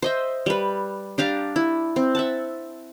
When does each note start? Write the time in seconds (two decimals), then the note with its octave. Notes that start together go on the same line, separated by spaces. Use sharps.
0.02 C5 D#5 E5
0.46 G3 B4
1.18 D4 G4 F5 A#5
1.56 E4
1.96 C4
2.15 E5 F#5 A5